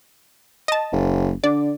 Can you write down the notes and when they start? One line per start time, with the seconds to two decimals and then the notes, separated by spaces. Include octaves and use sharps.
0.68 D#5 A5
0.93 F#1
1.44 D3 D5